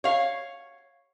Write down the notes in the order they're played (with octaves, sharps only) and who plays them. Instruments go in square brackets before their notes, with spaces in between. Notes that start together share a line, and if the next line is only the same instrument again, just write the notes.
[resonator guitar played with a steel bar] C#5 F5